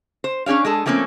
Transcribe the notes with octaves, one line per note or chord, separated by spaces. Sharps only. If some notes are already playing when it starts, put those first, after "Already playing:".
C5
C#4 D4 G#4 C#5 F5
G#3 G#4 A4
F3 A3 A#3 C4 C#4